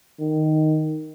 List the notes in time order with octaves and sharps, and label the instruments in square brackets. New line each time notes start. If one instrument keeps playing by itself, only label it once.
[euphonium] D#3